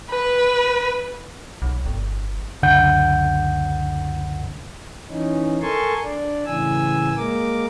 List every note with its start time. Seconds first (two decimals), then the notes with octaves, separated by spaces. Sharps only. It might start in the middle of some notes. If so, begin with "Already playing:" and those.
0.10 B4
1.62 B1
1.86 G1
2.63 C#2 F#2 D3 F#5 G6
5.09 E3 C#4 D#4
5.62 A4 A#4 G#5 A5 C6 C#6
6.04 D4 D5
6.45 A2 C#3 E3 G#5 E6
7.16 G#3 A#3 A#4 D6